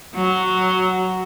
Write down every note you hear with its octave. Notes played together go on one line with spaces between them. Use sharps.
F#3